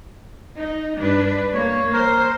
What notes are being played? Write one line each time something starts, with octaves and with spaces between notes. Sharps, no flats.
D#4
G2 D4 B4
A#3 C#5
A#4 C5